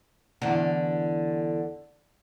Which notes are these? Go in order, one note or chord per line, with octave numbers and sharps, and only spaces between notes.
E2 D3